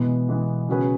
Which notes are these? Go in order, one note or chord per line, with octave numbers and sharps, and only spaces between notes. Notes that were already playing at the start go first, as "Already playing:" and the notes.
Already playing: B2 E3 G#3 B3
E3 G#3 B3
C#3 F#3 C#4 G#4 B4